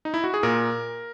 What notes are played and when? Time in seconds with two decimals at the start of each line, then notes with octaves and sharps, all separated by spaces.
0.05 D#4
0.14 E4
0.24 F#4
0.34 G#4
0.43 A#2 A#4